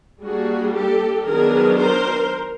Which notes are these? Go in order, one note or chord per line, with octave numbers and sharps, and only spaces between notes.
G3 A#3 D4 F#4 G#4
G4 A4
D#3 F#3 B3 D4 G#4 A#4
A#4 C5